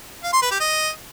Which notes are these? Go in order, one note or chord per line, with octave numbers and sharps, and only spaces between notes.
F5
C6
B4
G4
D#5